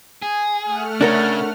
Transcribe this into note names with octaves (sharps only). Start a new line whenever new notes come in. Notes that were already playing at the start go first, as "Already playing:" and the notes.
G#4 G#5
A3 F#5 F6
C#3 D4 A#4 C#5 A6